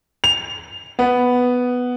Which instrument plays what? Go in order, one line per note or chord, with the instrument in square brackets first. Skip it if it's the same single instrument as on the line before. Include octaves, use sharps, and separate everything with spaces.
[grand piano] F7
B3